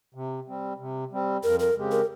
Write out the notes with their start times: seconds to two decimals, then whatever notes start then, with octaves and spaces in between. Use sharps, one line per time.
0.15 C3
0.48 G3 C4
0.79 C3
1.12 G3 C4
1.43 F2 A#4
1.60 A#4
1.76 C#3 G#3 C4 G4
1.91 A#4